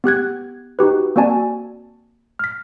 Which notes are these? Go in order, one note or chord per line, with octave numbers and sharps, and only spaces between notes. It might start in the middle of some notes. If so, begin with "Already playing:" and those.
B3 G4 F#6 G#6
D#4 F#4 G4 B4
A#3 C4 F#4 D5 G#5 A5
F6 B6